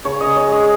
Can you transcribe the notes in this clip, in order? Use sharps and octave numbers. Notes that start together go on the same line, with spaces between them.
C#3 C#5
D#5
C#3
C#5
G#3 D#5